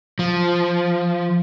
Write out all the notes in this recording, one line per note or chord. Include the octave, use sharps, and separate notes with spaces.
F3